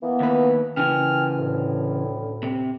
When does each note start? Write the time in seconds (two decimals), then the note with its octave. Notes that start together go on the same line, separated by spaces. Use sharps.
0.01 E3 A#3 B3
0.20 D#2 B4
0.77 C#3 E3 G5 G#5 F6
1.37 D2 A2
2.43 C3